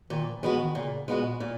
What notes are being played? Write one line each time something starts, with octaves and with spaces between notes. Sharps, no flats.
A#2 D#3
E3
E3 G#3 B3 F#4
D#3
A#2 C#3
A#2 G#3 B3 F#4
A#2